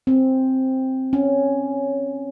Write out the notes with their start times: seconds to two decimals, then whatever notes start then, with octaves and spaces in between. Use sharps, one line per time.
0.07 C4
1.13 C#4